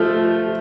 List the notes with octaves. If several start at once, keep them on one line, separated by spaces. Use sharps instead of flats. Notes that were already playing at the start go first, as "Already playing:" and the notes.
Already playing: F3 A3